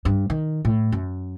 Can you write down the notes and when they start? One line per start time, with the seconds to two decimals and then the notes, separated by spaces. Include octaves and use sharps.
0.05 G2
0.30 D#3
0.65 A2
0.92 F#2